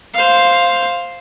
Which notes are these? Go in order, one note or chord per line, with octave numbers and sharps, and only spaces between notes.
C5 F5